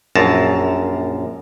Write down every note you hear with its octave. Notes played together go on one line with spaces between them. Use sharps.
A#1 F#2 A5 A#5